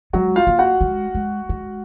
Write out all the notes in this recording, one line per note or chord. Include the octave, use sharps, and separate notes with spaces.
F#3 G#3 F#4
F4 F5
A#3
F#4 F#5
G#3
G#3
G#3